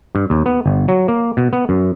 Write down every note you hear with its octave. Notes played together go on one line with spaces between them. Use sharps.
G2
D#2
B3
G1
F#3
A#3
B2
B3
F#2